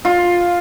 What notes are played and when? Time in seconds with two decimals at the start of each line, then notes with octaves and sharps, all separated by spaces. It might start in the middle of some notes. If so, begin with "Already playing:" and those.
0.05 F4